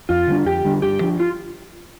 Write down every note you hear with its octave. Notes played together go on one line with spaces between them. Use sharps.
F2 F4
D3 G3 D4
F2 G4
D3 G3 D4
G2 G4
F3 D4
F4